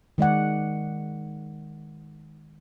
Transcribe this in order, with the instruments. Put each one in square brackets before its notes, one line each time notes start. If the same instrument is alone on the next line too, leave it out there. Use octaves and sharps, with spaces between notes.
[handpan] D#3 G#3 D5 F#5